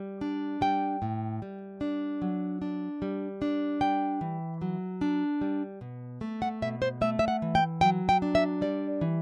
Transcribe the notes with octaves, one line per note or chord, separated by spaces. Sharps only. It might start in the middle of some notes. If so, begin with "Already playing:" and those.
Already playing: G3
D4
G3 G5
A2
G3
D4
F#3
D4
G3
D4
G3 G5
E3
F#3
D4
G3
B2
A3
F#5
B2 E5
C5
A3 E5
E5
F#5
E3
G5
F#3 G5
G5
D4
E5
G3 D5
E3